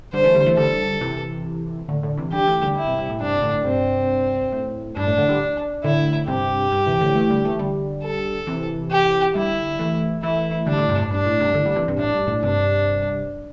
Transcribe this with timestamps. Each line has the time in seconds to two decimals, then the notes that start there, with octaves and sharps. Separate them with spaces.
0.13 D3 G3 C5
0.24 E3 A3
0.35 D3 G3
0.46 E3 A3
0.57 D3 G3 A4
1.01 C3 E3
1.88 A2 D3
2.03 A2 D3
2.17 C3 E3
2.32 D3 G3 G4
2.47 E3 A3
2.62 D3 G3
2.77 E4
2.87 G2 C3
2.98 G2 C3
3.10 A2
3.20 G2 C3 D4
3.42 A2 D3
3.64 G2 C3 C4
4.52 A2
4.97 G2 D4
5.07 A2
5.18 A2 D3
5.29 D3 G3
5.84 A2 D3 E4
6.27 G2 C3 G4
6.72 G2
6.86 C3 E3
7.01 A2 D3
7.15 E3 A3
7.30 D3 G3
7.45 E3 A3
7.59 D3 G3
8.04 A4
8.47 C3 E3
8.92 G4
9.35 D3 G3 E4
9.79 E3 A3
10.23 E3 A3 E4
10.66 D3 G3 D4
10.78 A2 D3
10.89 G2 C3
10.99 A2
11.11 G2 D4
11.26 A2
11.40 G2 C3
11.54 A2 D3
11.66 D3 G3
11.76 C3 E3
11.88 G2 C3
11.98 A2 D4
12.14 G2
12.28 A2
12.42 G2 C3 D4